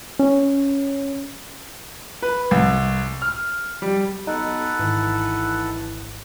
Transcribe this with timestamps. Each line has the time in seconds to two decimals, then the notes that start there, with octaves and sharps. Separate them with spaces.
0.19 C#4
2.22 B4
2.51 C2
3.22 F6
3.82 G3
4.27 B1 D#4 A4 B4 F#5
4.79 G#1 E3